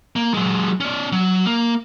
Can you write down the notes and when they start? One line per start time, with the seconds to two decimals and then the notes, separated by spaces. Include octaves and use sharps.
0.16 A#3
0.34 F#3 G#3
0.80 C#4 D5
1.12 F#3
1.46 A#3